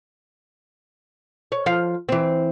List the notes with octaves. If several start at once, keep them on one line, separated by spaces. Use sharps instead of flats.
C#5
F3 F5
E3 C4